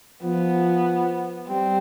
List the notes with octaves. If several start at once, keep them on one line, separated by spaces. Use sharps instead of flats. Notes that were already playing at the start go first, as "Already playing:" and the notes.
F3 B3
G3 C4